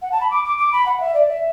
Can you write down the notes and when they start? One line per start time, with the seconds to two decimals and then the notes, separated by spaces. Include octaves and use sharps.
0.02 F#5
0.12 A5
0.21 B5
0.30 D6
0.45 D6
0.58 D6
0.72 B5
0.86 F#5
1.00 E5
1.14 D5
1.29 E5